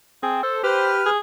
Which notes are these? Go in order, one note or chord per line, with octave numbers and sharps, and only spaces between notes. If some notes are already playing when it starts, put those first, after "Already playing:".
C4 G#4
A4 C5
G4 B4 C5 F6
G#4